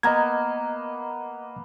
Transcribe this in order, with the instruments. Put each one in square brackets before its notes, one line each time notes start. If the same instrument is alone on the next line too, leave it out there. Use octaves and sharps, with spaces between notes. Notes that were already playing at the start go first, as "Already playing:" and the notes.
[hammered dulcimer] A#3 B3 [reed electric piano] D#5 A#5 G#6